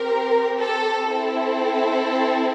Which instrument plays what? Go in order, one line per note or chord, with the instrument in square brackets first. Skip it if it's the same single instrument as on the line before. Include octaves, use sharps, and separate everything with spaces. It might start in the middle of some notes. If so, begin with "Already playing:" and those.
Already playing: [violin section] C4 G4 A#4
A4
C4 E4 A4